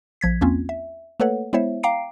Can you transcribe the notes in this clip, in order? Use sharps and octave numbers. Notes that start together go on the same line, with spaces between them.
A#1 F3 G#6 B6
E2 A#3 C4 C#4 F4
E5
A3 A#3 A4 B4 C#5 F#5
G#3 B3 E4 C5 C#5 E5
F5 G5 A#5 D6 C7 D7